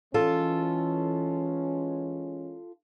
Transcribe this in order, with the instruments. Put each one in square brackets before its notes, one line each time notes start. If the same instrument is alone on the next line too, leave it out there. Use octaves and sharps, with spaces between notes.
[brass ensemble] E3 G#3 C#4 [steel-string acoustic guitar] F4 A4